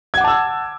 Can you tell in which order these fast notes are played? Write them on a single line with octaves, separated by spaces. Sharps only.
G#6 F#5 D6 A5 E6